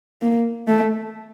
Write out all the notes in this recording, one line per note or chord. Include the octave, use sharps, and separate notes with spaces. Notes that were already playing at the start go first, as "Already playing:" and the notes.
A#3
A3